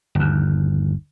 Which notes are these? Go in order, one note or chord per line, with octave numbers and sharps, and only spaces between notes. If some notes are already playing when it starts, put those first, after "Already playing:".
G1 D#2